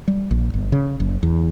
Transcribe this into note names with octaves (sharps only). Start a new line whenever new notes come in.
G3
A#1
G1
C#3
F#1
E2